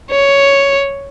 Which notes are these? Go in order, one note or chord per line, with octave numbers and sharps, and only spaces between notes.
C#5